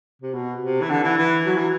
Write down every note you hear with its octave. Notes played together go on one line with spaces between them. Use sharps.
C3
B2
C3
E3
D3
E3
E3
F#3
E3